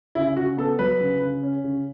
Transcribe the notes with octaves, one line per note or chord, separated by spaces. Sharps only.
C#3 E4
C#3 F#4
B3 A4
F#3 B4
C#3
C#3
C#4
C#3